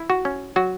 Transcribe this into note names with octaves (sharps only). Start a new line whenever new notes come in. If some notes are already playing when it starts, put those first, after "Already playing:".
Already playing: E4
F#4
C#4
F#3 F#4